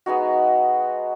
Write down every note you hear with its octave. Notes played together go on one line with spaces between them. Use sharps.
G#3 B3 D#4 F#4